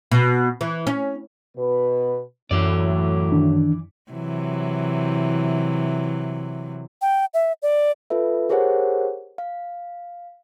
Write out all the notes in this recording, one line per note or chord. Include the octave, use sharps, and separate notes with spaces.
B2
E3
C#4
B2 B4
F#2 A2 E3 F#3 D5
D#3 D4
C3 E3 F#3
G5
E5
D5
F4 A4 B4 E5
G4 G#4 A#4 C5 C#5 F#5
F5